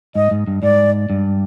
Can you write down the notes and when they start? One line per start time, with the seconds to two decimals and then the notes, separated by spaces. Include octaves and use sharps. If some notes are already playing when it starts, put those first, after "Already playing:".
0.15 G#2 D#5
0.31 G#2
0.47 G2
0.63 G#2 D5
1.10 G2